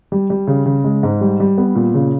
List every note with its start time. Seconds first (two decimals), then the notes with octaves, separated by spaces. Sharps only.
0.12 G3
0.30 G3
0.47 C#3
0.66 C#3
0.84 G#3
1.03 G#2
1.21 G3
1.40 G3
1.58 B3
1.75 A#2
1.94 C#3